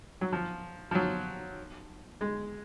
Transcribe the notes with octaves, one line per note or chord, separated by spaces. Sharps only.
F#3
F3
F3
F#3
G#3